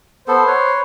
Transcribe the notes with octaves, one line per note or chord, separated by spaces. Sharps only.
B3 A4 C5
B4 C#5